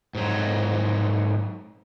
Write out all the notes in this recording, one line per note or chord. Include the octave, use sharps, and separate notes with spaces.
G#2 F#3